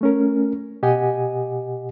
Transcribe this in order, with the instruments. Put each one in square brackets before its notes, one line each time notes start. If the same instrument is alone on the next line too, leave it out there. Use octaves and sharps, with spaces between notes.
[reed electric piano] A3 C#4 A#4
B2 G4 D#5 F#5 G#5